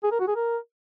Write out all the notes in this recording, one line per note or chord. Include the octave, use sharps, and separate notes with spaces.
G#4
A#4
F#4
G#4
A#4